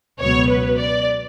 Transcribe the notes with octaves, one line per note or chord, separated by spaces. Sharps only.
C#2 B2 F#3 B3 C#5
B4
D5